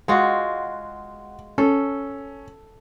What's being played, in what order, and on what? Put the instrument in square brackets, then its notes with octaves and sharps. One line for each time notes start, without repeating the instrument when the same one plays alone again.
[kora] G#3 F4 F#4 [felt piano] F#5
[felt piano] C#4 [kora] A4